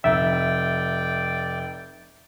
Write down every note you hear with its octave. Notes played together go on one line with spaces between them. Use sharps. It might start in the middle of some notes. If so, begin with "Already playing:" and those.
F1 D5 E5 G5